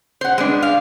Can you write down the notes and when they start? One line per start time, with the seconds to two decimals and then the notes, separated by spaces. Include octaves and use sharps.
0.21 C5 F#5
0.38 G#3 B3 D4
0.62 F5